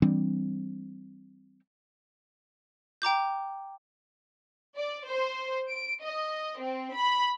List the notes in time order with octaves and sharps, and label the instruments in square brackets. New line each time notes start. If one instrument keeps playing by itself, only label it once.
[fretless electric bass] E3 G3 C4 D4
[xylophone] G5 A#5 D6 G6
[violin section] D5
C5
D7
D#5
C4
B5